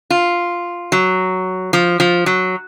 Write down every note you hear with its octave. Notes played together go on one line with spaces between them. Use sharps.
F4
F#3
F3
F3
F#3